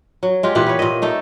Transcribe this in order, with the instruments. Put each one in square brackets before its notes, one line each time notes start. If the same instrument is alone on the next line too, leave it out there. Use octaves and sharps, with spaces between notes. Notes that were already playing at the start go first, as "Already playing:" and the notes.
[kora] F#3
G#3 F4 G4
A#2 E3 G4 F#5
B3 C#5
A#2 D#5
A3 D#4 A4